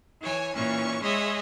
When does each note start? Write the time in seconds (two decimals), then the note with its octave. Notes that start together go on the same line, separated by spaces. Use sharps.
0.20 E3 C#5 G#5
0.54 A#2 E3 C#4 C#6
1.01 G#3 G#4 C#5 D#5 E5